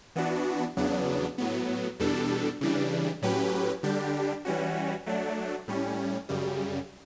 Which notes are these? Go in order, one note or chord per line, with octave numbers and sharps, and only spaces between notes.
E3 B3 D4 F#4
E2 C#3 F#3 B3 D4
A2 F#3 B3
E2 B2 G3 D4 A4
C#3 E3 G3 D4
A2 F#3 C#4 G4 B4
D3 G3 D4 G4
E3 G3 C#4 F#4
F#3 A3 D4
A2 G3 C#4
F#2 C#3 G3